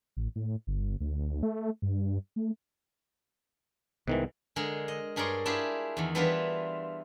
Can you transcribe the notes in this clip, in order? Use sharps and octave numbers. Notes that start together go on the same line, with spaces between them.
A1
A2
G1
D2
A3
G2
A3
C2 G#2 D#3 E3 B3
D3 G#3 G#4 A#4
D#5
G2 G#4 A#4 C#5 D5 C6
D4 E4 F4 G4 G#4
E2 D#3
E3 G3 B3 D4 E4 F4